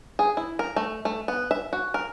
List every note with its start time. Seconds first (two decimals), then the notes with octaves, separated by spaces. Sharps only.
0.19 G#4
0.37 E4
0.59 A#4
0.76 A3
1.05 A3
1.28 B3
1.51 E5
1.73 F#4
1.94 A#4